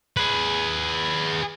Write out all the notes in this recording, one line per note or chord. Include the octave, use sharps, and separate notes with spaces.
G#4 B4